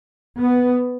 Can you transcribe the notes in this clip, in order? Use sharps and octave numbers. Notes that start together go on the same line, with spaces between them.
B3